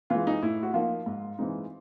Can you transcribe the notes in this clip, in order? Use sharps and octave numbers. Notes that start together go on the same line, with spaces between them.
E3 G#3 F4
D#4
A2 E4
F#4
F3 A#3 D#4 F4
G#2
E3 G#3 C4 D#4